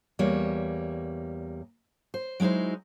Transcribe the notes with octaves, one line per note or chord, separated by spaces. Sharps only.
E2 G3 A#3 C#5
C5
F#3 G#3 D#4 E4 C5